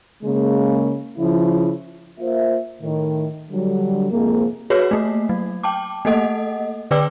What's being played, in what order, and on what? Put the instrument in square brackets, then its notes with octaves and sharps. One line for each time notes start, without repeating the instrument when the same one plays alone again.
[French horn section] C#3 G#3 A#3
C#3 F3 E4
[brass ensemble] A#3 F4 C5 E5
A2 D#3
D3 F#3 G3
F2 G#2 C3 G#3 A#3
[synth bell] F#4 G#4 B4 C#5
A3 A#3
F#3
G5 A5 D6
A3 A#3 A4 D#5 F#5
D3 B4 D5 G5 D6 E6